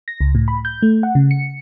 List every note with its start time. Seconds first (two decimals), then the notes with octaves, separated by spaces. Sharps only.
0.08 A#6
0.21 C#2
0.35 A2
0.48 B5
0.65 G6
0.82 A3
1.03 F#5
1.15 C#3
1.31 C#7